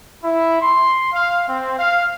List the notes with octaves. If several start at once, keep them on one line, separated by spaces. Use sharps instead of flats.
E4
C6
F5
C4
F5